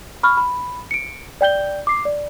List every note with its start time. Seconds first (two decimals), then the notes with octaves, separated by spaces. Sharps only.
0.23 B5 C#6 F6
0.37 B5
0.91 C#7 D7
1.41 D5 G5 G6 G7
1.87 D6 C7
2.05 D5